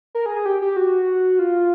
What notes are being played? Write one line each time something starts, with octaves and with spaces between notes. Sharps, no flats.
A#4
G#4
G#4
G4
G4
F#4
F4